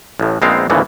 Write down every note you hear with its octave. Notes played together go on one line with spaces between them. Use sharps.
A1 A2
A#1 G#3 B3 C4 D#4 F5
G#1 D2 C#3 E3 F3 B3